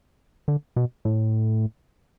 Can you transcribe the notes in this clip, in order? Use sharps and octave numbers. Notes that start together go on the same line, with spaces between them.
D3
B2
A2